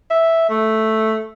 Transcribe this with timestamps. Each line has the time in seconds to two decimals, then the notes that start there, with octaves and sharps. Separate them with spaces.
0.10 E5
0.50 A3